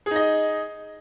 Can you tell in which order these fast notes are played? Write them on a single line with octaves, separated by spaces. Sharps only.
G#4 D#4 D#5